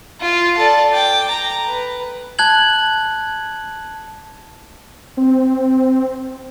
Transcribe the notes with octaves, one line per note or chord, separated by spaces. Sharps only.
F4
A4 D5
G5 D6
A#5
B4
A5 F#6 G#6 F#7
C4